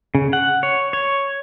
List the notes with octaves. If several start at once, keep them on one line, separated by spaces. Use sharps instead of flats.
C#3
F#5
C#5
C#5